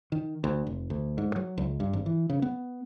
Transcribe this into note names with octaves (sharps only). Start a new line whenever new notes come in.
D#3
D2
F1
D2
G#2
F#3
C#2
G2
G#1
E3
C#3
B3